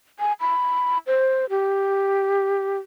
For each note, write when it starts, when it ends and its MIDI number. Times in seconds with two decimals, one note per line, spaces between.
0.20 0.33 80
0.40 0.98 83
1.07 1.49 72
1.50 2.79 67